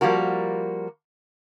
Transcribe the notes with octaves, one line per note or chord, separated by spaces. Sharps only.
F3 G3 A#3 F#4 A#4